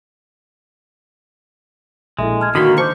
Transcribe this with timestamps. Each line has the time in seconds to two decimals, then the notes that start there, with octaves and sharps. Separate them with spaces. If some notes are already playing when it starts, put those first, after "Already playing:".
2.19 A#1 G#3 E4 A4 E5
2.40 A5 F6 G#6
2.55 D3 D#3 A#3 F#4 D#5 B5 C6
2.78 C5 A5 C#6 D6 G6